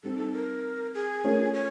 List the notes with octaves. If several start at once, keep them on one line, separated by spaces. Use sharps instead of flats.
G3 C4 D#4 A4
A4
A#4
G#4
A3 C#4 F4 A#4
C#5